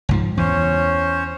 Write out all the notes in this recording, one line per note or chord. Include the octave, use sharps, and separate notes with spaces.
C#2 G#2 F3
E2 C#4 C5 C#5